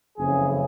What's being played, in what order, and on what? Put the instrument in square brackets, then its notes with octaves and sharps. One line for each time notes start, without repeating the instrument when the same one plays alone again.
[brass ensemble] F#1 F2 C#3 E3 G#4